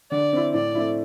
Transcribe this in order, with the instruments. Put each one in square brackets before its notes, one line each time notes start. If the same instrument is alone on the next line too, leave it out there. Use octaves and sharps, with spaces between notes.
[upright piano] D3 [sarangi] D5
[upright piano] C4 E4
[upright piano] A2 [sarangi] D5
[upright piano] A3 C4 E4